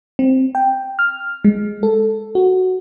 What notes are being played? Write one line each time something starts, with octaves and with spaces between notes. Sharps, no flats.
C4
G5
F6
G#3
A4
F#4